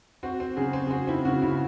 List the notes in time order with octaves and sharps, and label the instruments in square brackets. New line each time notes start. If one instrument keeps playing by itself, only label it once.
[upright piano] C4 F#4
C4
C#3 G#4
C4
G#4
C4 F#4
C4 E4
C#3 F#4
C#3 E4